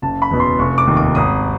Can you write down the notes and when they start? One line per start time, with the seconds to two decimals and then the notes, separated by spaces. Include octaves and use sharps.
0.02 F#1 A5
0.22 B5
0.31 E2 B2
0.40 C6
0.59 F1 C#6
0.78 D6
0.87 D#2 D#3
0.97 D6
1.15 G#1 D#6